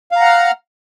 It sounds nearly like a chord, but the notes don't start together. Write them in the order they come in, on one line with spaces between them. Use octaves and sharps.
F5 A#5 F#5 F6